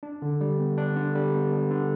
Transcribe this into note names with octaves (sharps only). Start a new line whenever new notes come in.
D4
D3
G3
B3
D4
D3
G3
B3
D4
D3